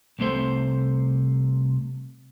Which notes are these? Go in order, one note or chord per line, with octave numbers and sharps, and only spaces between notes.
C2 C3 A3 C5